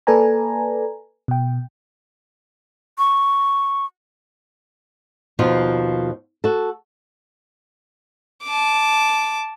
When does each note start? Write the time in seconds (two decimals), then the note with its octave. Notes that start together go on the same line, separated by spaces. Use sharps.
0.07 A#3 A4 B4 D5 G#5 A#5
1.28 B2 G5
2.98 C#6
5.39 D#2 B2 F3 F4
6.44 F#4 A4
8.44 A5 D6